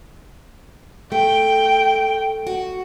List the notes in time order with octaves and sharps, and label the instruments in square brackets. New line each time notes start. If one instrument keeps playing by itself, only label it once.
[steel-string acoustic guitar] A3 [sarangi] G5
[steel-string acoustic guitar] F#4